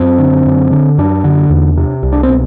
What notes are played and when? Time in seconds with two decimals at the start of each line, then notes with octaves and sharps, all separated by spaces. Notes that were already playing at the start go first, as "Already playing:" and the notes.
Already playing: F#2 C4
0.18 D3
0.46 F#2
0.71 D3
0.98 F#2 D4
1.24 D3
1.50 E2
1.77 C3
2.03 C2
2.12 D4
2.23 C4
2.29 B2